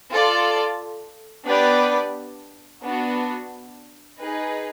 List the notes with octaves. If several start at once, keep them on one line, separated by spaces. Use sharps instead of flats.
F4 A4 D5
B3 D4 G4 B4 D5
B3 D4 F#4
D#4 G#4 B4